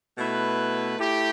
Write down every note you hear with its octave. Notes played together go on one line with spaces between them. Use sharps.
B2 A3 E4 B4
A3 E4 G4